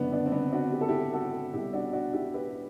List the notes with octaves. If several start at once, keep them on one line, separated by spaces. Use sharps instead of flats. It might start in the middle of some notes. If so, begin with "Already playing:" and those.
Already playing: F#1 F#2 D3 B3 D4
B3 D4
C4
B3 D4
D4 F#4
G4
A4
E4 G4
F#4 A4
C2 B2 G3 E4 G4
D4 F#4
D4 F#4
E4 G4
G4 B4